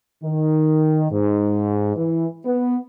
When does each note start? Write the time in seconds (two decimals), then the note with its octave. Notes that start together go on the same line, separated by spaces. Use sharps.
0.24 D#3
1.12 G#2
1.96 E3
2.45 B3